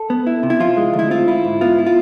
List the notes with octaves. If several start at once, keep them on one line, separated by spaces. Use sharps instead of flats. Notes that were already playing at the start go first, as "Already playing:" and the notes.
Already playing: A4
B3
E4
C3
E4
F3 F4
G#3
D2
E4
C4 F4
E4
G#2
B3 F4
E4
F4